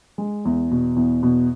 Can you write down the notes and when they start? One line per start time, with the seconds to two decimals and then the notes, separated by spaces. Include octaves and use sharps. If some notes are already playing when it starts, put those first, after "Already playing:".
0.18 G#3
0.45 E2
0.71 B2
0.96 E2
1.23 B2